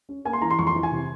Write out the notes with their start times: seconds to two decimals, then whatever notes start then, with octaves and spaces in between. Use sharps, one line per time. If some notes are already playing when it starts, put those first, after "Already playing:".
0.09 C#4
0.25 A#3 G#5
0.33 C6
0.42 E3 A#5
0.50 C6
0.59 F2 C#6
0.67 C6
0.75 E3
0.83 G#5
0.92 C3